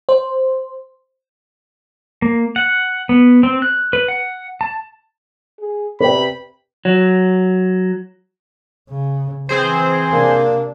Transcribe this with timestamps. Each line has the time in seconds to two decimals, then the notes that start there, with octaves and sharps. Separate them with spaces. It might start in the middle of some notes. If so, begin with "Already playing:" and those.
0.09 C5
2.22 A#3
2.56 F#5
3.09 B3
3.43 C4
3.62 F#6
3.93 B4
4.08 F#5
4.61 A5
5.59 G#4
6.00 C3 B4 D5 G5 B5
6.85 F#3
8.89 C#3
9.49 E3 C4 G#4 C5
10.13 C3 A#3 D4